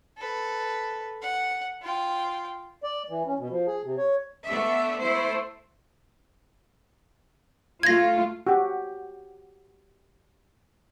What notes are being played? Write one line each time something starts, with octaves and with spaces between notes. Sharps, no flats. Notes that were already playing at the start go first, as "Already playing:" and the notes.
A4 B4
F#5
F4 G5
D5
E3
C#4
B2
F3
G#4
C3
C#5
A3 B3 D4 E5
A3 E4 C5
A3 F4 G#6 A#6
F#4 G4